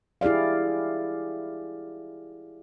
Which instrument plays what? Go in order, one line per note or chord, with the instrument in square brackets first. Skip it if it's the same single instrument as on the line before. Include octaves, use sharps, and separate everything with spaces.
[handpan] E4 G4 G#4 D5 F5